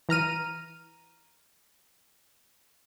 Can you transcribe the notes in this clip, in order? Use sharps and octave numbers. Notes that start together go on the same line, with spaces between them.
E3 A#5 F6 D#7